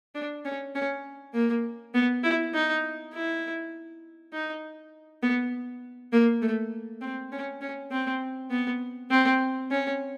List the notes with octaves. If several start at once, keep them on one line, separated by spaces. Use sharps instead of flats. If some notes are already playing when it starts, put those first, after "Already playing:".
D4
C#4
C#4
A#3
B3
E4
D#4
E4
D#4
B3
A#3
A3
C4
C#4
C#4
C4
B3
C4
C#4